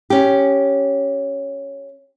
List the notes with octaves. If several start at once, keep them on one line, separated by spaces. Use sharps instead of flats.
C#4 G4